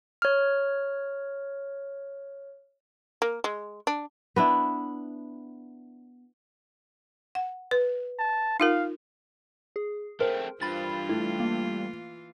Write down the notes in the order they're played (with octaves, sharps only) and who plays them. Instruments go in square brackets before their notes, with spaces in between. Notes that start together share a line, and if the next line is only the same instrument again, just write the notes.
[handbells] C#5 F6
[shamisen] A#3
G#3
D4
[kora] B3 D4 E4
[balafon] F#5
B4
[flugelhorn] A5
[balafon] D#4 F4 A#4 [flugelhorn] F5
[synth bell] G#4
[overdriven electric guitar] A3 C4 [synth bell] A#4 [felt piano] C5
[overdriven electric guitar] G2 [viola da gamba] E3 F4 [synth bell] B5 A6
[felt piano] A3 [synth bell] E4
[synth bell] A#3